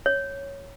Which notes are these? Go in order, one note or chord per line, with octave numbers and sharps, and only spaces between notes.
C#5